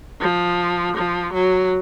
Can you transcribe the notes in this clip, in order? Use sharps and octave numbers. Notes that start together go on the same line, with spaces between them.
F3
F3
F#3